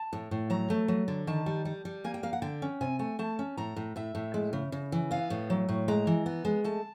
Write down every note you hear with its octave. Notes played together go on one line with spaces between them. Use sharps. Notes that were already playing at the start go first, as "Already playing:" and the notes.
Already playing: A5
A2
A2
F#3 A#5
A3
F#3
D3
D#3 A5
G3
G3
G3
A#3 G#5
G5
A#3 F5
F#5
D3 G5
C#4
C3 G#5
A3 G#5
A3 A5
C#4
A2 A#5
A2
A2 E5
A2
G#3
C#3
C#3
E3
B3 F5
A2
F#3
A2
G#3 A#5
E3
B3
G#3
A3 A5